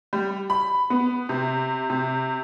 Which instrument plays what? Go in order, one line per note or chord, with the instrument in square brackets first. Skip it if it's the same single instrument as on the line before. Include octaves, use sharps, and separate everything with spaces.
[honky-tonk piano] G3
B5
B3
C3
C3